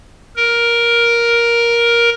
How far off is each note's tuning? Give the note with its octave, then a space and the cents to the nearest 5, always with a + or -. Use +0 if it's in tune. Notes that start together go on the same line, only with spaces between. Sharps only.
A#4 +10